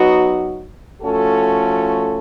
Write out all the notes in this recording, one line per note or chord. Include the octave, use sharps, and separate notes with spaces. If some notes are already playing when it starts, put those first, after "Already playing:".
Already playing: F#3 B3 D#4 F#4
F3 A3 C#4 F#4 A4